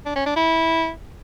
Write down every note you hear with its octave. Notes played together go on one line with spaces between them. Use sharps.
D4
C#4
D4
E4